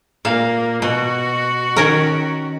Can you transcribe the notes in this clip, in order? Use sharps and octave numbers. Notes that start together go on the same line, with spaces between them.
A#2 A#3 F5
B2 F#4
D#3 C#4 A#4